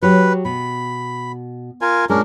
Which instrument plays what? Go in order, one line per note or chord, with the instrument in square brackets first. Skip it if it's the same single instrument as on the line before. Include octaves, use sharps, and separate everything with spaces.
[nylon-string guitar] F#3 G4 [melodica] B4
[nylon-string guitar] B2 [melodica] B5
[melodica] F4 A#4 G#5
[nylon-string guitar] A#2 G#3 [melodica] C#4 D4 A#4